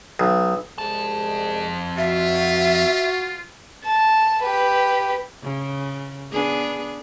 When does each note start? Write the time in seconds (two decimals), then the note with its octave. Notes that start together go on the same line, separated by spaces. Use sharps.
0.20 B1
0.78 C2 F2 G#3 A5
1.98 F4 F#4 E5
3.84 A5
4.43 G4 B4
5.43 C#3
6.32 B3 D4 G#4